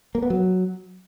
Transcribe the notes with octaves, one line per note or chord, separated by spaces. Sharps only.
A#3
B3
F#3